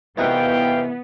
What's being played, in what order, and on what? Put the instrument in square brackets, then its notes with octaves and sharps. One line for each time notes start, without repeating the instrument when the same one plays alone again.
[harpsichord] C2 D#4 F#4 [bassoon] E3 [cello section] B3 [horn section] F5 G5